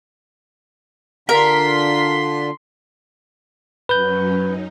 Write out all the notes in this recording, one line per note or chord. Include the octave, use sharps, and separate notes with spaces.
D3 D4 F4 A#4 C6 B6
F#2 F#3 C#4 B4 G6
D#4